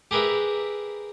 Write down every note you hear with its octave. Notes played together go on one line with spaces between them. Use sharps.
G4 G#4 A#4 B4 E5